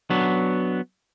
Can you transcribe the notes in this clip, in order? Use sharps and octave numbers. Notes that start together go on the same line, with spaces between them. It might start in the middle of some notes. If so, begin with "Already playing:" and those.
F#3 B3 D4